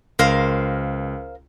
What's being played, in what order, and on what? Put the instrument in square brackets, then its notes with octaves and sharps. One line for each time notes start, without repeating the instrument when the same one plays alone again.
[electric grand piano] C#2 [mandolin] A#4 C5 F5